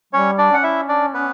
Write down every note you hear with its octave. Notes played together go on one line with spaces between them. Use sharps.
G3 C#4 C#5
D4 D5
C#4 F#5
E4 E5
D4 D5
B3 B4